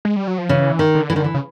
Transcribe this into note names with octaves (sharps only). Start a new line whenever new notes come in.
G#3
G3
F#3
F3
C#3 E3
D#3
D3
E3
D#3
E3
C#3